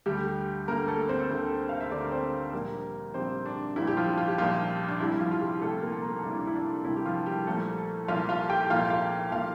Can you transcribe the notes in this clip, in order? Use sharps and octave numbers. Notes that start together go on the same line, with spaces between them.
D2 D3 G3 A3 G4
D2 D3 A3 A#3 A#4
A3 A4
C4 C5
D2 D3 A3
F5
E5
D2 D3 A3 D4 D5
A#4
C4 C5
A#1 A#2 G3 A#3 A#4
A#1 A#2 G3 C4 C5
D4
A#1 A#2 G3 E4
G4
F3 F4
F4
G4
A#1 A#2 F3 G3 F4
D4
C2 C3 G3 E4
E4
F3 F4
F4
G3 G4
C2 C3 G3 A3 A4
A#3 A#4
A#3 A#4
C2 C3 G3 D4
E4
D4
E4
D4
C2 C3 G3 E4
G4
F3 F4
G3 G4
C2 A#2 F3 A3 A#3 A4
C2 A#2 F3 A#3 F4 F5
F4 F5
G4 G5
C2 A#2 F3 A#3 F4 F5
F4 F5
A#2 F3 A#3 F4 F5